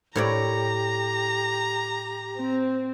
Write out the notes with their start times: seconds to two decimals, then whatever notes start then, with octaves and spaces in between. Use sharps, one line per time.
0.15 A2 G4 C#5 D5 A#5
2.37 C4